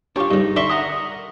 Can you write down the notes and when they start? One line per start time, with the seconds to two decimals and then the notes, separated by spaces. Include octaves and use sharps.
0.16 D4 F4 G4 C#5 C#6
0.31 G2 C#3 D#4
0.56 D3 D5 E5 C6 C#6
0.69 A#4 F#5 D#6